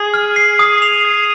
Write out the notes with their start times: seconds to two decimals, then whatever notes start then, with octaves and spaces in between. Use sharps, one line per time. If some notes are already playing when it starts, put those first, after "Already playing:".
Already playing: G#4
0.14 F6
0.36 C7
0.59 D#6
0.82 F7
1.05 G#6